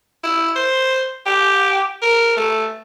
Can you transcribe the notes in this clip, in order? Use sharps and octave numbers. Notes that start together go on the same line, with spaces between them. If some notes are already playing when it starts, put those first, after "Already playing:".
E4
C5
G4
A#4
A3